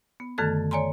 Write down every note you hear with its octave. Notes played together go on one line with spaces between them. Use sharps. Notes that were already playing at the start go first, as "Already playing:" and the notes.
B3
F#2 D3 D#3 A3 A4 G#6
C#5 D5 G#5 A#5 C6